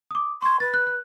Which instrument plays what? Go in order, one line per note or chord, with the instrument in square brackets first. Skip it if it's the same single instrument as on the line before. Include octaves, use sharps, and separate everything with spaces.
[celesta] D6 D#6
[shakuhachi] C6 [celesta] C#6 G#6
[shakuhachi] B4 [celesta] A6
[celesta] F#6
F#6